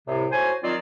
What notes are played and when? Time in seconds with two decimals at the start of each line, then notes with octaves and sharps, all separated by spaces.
0.07 C2 A2 C3
0.31 A2 F#4 C5 G#5
0.63 D#3 F#3 C4 F4 D5